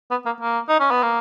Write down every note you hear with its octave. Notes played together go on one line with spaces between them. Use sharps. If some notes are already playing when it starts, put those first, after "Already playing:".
B3
A#3
A#3
D#4
C#4
B3
A#3